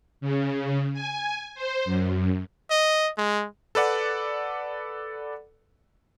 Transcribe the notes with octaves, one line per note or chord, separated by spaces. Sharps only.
C#3
G#5
C5
F#2
D#5
G#3
A4 B4 D5 F#5